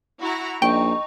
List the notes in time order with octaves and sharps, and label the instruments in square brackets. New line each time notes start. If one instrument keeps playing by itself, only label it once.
[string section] E4 F#4 A#5
[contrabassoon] A#1 [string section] D#4 [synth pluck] G5 [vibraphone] C#6